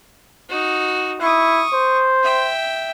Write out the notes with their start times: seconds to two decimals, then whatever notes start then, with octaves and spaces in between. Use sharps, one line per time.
0.49 D#4 F#4
1.21 E4 C#6 D#6
1.73 C5
2.23 E5 G5